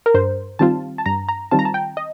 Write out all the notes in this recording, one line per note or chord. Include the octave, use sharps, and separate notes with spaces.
A#4
G2 C5
D#3 G3 C4 F4 A5
A5
G2 A#5
A#5
D#3 G3 C4 F4 A5
A#5
A5
G5
D#5